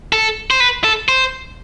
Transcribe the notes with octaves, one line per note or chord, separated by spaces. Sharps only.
A4
C5
B4
A4
C5